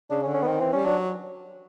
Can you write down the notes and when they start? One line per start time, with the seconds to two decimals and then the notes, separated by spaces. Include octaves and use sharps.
0.10 C#3 D4
0.23 C#4
0.26 D3
0.35 C#4
0.43 D#3 B3 C4
0.60 E3 C4
0.73 G3 C#4
0.85 F#3 D4